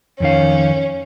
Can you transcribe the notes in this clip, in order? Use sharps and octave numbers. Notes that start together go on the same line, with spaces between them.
F2 D#3 C#4 F5